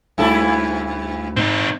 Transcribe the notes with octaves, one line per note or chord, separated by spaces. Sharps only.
D2 G2 E4 A4
G#2 C4 D#4